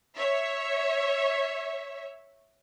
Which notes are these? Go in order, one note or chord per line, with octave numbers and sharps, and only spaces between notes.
C#5 E5